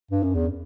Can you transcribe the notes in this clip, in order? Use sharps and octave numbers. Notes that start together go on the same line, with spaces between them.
G2
F#2
E2